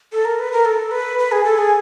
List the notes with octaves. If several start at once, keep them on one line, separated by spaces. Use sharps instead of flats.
A4
A#4
B4
A#4
A4
B4
B4
G#4
A4
G#4